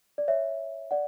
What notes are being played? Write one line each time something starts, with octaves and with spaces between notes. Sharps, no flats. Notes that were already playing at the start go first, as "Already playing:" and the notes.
D5
C#5 E5
D5 F#5